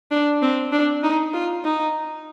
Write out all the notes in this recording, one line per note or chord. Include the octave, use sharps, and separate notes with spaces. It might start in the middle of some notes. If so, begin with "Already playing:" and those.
D4
C4
D4
D#4
F4
D#4